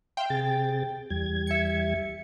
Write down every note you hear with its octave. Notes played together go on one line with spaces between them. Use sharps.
E5 F5 G5 C6
C3 G#4 A6
E2 G3 G#6
E5 C#7